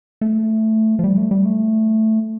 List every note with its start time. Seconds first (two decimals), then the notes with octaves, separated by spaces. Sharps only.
0.21 A3
0.99 F3
1.04 G3
1.17 A3
1.31 G3
1.45 A3